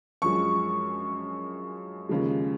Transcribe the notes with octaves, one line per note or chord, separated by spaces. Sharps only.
F#2 F3 G#3 C#6
D#2 C#3 F3 G#3